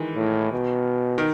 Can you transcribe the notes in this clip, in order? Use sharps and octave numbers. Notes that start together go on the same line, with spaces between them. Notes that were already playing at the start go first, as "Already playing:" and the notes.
Already playing: D#3 E3 G#3
A2
B2
D#3